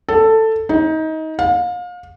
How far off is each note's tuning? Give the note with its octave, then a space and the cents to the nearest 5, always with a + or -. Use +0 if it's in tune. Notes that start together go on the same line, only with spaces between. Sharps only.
A4 +10
D#4 +25
F5 +35